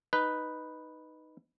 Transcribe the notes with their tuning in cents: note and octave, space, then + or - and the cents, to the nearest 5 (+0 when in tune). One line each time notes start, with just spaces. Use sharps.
D#4 +0 B4 +0